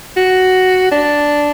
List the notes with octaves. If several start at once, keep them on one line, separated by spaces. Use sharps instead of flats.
F#4
D4